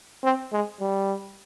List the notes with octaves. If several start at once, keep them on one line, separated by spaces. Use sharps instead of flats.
C4
G#3
G3